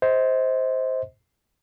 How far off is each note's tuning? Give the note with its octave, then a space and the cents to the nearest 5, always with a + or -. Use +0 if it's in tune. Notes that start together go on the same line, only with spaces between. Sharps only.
C5 +0 D#5 +35